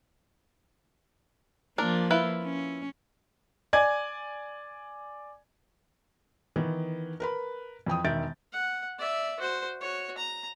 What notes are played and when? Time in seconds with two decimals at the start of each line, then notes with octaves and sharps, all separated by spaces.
1.78 F3 A#3 D4 A#4
2.11 E4 F4 B4
2.43 C#4
3.73 D5 G#5 G#6
6.56 D#3 E3 B3
7.20 A#4 B4 B5
7.86 F2 E3 G5 D#6
8.04 E1 D#3 E5 G6 A6 D7
8.53 F#5
8.98 D5 E5
9.40 F#4 C5
9.81 F#4 C#5
10.18 A#5